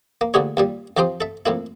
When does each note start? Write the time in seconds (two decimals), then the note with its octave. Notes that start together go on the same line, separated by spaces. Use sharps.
0.21 A#3
0.34 D2 A#2 D3 G4 G#4 C#5
0.57 D#2 A#2 G3
0.97 F2 F3 G4 C5 G5 D#6
1.21 A4 E5
1.46 F2 A2 A#3 E4